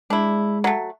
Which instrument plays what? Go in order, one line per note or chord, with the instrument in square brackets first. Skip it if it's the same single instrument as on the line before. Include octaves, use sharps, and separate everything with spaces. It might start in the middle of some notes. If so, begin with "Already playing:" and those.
[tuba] G#3 [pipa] D4 E4
[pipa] F#3 A3